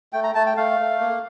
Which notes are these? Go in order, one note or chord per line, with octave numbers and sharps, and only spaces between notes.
A3 G5
A#5
A3 A5
G5
A3 F5
A3
A#3